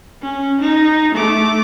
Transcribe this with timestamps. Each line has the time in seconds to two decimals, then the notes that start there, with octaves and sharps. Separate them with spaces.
0.22 C#4
0.61 D#4
1.15 A3 D6